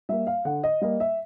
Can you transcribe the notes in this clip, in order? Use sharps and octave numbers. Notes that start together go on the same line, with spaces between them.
G3 A#3 E5
F5
D3 F#5
D#5
G3 A#3 D#5
E5